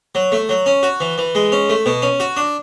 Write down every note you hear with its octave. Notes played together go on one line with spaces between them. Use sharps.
F#3
A3
F#3
C#4
F#4
E3
E3
G#3
C#4
A3
B2
C#4
F#4
D4